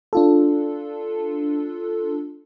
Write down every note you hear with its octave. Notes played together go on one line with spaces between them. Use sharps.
D4 F4 A4